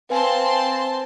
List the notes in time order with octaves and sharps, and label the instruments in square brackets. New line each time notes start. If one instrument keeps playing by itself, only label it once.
[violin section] C4 A5 C6 [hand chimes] B4 F5 G#5